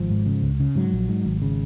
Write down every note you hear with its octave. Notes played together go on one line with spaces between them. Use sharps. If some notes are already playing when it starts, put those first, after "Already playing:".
Already playing: G#1 F3
G#2
C#3
C#2
C#3
G#2 F#3
A#1
G#2
G#1
C#3